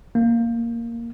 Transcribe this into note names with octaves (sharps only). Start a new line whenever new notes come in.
A#3